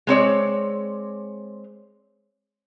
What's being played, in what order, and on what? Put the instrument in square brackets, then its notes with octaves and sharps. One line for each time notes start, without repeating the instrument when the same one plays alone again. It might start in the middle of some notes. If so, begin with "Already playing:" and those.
[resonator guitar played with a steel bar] G#3 C4 C#5 D5